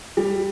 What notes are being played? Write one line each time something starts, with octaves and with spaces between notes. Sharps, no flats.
G3